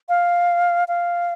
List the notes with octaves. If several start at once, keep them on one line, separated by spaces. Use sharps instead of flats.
F5
F5